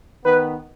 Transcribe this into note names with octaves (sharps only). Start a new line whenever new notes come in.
D#3 B3 B4